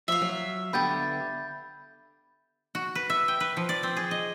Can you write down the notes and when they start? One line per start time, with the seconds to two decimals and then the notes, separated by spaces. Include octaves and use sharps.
0.08 F3 E5 F5
0.22 F#3
0.73 D3 B3 G4 B5 G6 A6
2.75 F#4
2.95 B4
3.10 E5
3.28 G5
3.40 B4
3.57 F3
3.69 D5
3.83 C4
3.97 G#4
4.11 D#5